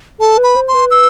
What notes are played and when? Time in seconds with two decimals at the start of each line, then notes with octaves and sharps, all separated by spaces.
0.20 A4 A5
0.37 B4
0.44 B5
0.56 C5
0.68 C6
0.74 B4
0.91 E6